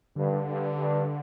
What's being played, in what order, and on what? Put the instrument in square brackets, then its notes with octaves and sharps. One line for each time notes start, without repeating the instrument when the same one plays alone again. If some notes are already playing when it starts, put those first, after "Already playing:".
[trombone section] G2 [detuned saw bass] D3
[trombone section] G2
G2